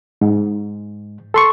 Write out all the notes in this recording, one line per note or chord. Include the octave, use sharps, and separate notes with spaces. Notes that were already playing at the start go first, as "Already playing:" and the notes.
G#2
A4 C6 C#6